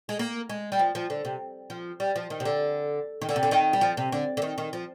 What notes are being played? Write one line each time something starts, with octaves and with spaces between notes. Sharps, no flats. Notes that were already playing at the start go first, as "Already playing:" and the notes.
G#3
A#3
G#3
G3
F3
F3
D3
C3
F3
G3
F3
D#3
C3
D3
D#3
D3
C3
D3
D#3
G3
F3
C3
D3
D3
D#3
D#3
F3